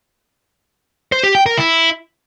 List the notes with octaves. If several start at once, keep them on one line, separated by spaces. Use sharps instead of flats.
C5
G4
G5
A#4
E4